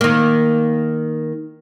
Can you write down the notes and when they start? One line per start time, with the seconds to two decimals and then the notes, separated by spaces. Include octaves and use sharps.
0.01 D#3 A#3